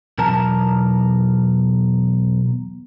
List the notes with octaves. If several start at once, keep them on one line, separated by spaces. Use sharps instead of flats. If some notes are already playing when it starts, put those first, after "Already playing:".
B1 E2 A#4 A5